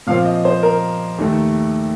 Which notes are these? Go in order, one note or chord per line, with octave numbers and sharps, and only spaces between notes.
A#2 F3 C4 F5
D#5
C5
A#4
D#2 D#3 A3